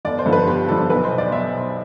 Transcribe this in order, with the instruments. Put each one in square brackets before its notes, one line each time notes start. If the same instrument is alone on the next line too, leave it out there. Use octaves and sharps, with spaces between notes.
[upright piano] G1 D5
C5
G2 D3 F3
B4
G1 G4
G2 D3 F3 A4
B1 B4
C5
B2
D5
B1 E5
B2